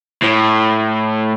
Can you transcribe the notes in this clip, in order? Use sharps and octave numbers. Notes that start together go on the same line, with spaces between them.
A2